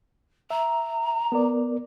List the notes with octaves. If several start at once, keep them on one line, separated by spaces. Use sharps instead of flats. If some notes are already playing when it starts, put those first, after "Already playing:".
E5 A#5
B3 A#4 D5